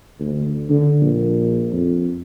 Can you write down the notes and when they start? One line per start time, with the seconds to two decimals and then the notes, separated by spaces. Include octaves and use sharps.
0.19 D2
0.69 D3
1.01 A#1
1.72 F2